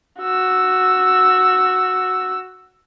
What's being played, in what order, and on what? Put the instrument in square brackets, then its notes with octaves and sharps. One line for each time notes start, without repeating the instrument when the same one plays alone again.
[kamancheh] F#4 E6